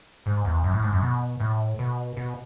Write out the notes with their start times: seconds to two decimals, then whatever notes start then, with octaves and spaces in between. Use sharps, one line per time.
0.26 G#2
0.45 E2
0.64 F#2
0.74 A2
0.83 G#2
0.93 F#2
1.02 B2
1.40 A2
1.79 B2
2.17 B2